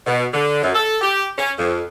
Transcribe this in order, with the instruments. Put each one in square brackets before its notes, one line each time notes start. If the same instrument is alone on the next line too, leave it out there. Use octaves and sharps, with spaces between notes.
[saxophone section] B2
D3
F#2
A4
G4
C#4
F2